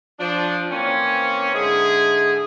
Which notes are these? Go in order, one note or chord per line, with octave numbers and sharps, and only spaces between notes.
F3 D4
E3 A#3 C4 C#4
G#2 D3 G#3 E4 G#4